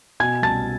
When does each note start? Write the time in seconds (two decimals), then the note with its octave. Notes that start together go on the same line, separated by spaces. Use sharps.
0.20 B2 G#5 G#6
0.42 C2 A5 A6